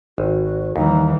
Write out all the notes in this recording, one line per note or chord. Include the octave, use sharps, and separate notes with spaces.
G#1 F#4
D#2 D#3 E3 G3 D#4